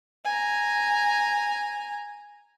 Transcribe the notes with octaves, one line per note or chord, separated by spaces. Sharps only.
G#5 A#5